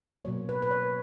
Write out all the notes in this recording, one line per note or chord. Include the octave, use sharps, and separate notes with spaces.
B2 F#3 A#3 C#5
B4
B4
C#5